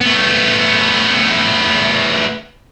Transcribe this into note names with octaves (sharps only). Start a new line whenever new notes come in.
A3 B3